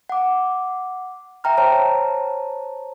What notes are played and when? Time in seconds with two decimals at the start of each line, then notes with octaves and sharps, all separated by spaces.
0.09 F#5 D6
1.44 E5 G5 A#5 F6
1.58 C5 C#5 A5 A#5